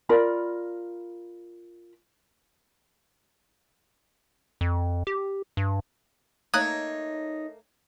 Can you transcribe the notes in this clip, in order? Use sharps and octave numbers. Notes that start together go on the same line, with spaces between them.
F4 A#4 D5 B5
F2
G4
G2
A3 A#3 D#4 C#5 A#5 D#6 F#6 G#6